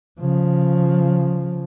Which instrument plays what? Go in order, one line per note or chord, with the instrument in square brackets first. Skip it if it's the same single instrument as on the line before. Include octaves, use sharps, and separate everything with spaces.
[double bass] C#3 F3